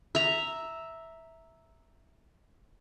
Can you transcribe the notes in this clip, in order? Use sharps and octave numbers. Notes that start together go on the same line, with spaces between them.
E5 A#5